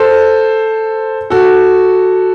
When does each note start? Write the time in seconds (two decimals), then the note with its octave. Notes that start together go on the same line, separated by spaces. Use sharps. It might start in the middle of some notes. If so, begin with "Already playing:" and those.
Already playing: A4 C5
1.30 F#4 A4